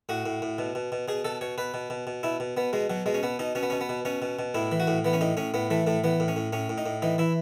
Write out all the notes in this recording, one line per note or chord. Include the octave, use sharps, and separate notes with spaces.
A2 F#4
A2
A2
B2
B2
B2
B2 G#4
B2 A4
B2 C#5
B2 B4
B2
B2
B2
B2 E4
B2
B2 B3
B2 G#3
B2 F#3
B2 G#3
C#4
B2 B3
B2 D#4
B2 C#4
B3
B2 C#4
B3
B2
B2 C#4
B2
B2
A2 E4
E3
F#4
A2
E3 B3
C#4
A2 D#4
A2 C#4
A2 B3
E3 A3
A2 A3
E3 B3
A2
C#4
A2
A2 C#4
A2
D#4
A2
E3 D#4
E3 E4